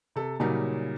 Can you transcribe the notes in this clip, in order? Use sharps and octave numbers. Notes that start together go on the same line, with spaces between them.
C3 A4
A#2 C#3 F#3 G3 C#4 D#4